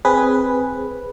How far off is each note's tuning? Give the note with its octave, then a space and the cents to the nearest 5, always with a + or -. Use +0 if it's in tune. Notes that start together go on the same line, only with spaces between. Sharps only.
C4 +0 G#4 +0 B4 +0